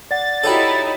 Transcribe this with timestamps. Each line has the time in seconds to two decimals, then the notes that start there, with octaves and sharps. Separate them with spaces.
0.11 D5 F#5 A6
0.44 D#4 E4 F#4 G4 A4 C#5 B5